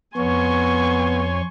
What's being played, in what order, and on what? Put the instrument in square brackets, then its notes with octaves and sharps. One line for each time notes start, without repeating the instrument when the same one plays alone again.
[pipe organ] F2 C#5 [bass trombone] B3 [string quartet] G#5 C6 C#6